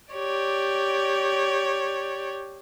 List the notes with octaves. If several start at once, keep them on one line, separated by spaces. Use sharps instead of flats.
G4 C#5 D5